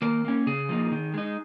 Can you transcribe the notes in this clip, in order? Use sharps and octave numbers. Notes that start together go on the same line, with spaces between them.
D#3 A#3 A#4
A#3 C#4
C#3 G#4
F3 A#3 D#4
D#3
G#3 D#4